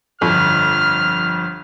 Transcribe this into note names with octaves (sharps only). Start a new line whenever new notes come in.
G1 F2 F6